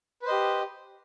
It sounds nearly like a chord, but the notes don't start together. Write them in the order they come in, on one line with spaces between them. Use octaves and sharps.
B4 C5 D#5 G4